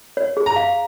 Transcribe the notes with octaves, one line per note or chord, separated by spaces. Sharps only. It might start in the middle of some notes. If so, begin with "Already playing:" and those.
C#5
G#4
A#5
F5